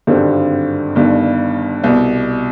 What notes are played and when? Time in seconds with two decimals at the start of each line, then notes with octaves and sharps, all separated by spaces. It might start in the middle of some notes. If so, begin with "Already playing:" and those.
0.07 G#1 G2 D3 G3 C4
0.95 G1 G2 D#3
1.84 C2 B2 B3